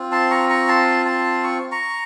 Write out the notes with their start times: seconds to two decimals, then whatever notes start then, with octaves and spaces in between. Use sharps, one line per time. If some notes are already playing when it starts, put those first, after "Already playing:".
Already playing: C4 F4
0.12 A5 C6
0.31 A#5 C#6
0.49 A#5 C#6
0.68 A5 C6
1.06 A5 C6
1.43 C#6
1.72 A#5 C#6